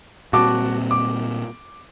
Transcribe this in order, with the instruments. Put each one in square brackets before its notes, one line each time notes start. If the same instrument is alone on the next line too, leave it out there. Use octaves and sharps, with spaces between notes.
[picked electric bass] A#2 G3 C4 [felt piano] F#4 A5 D6
[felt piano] D6